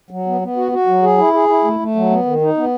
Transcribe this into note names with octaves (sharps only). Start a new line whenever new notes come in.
F#3
B3
B3
F#4
F#4
F#3
G#4
E4
G#4
E4
A3
A3
F#3
B3
D#3
D#4
B3